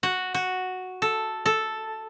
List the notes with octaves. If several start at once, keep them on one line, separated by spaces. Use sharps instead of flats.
F#4
F#4
A4
A4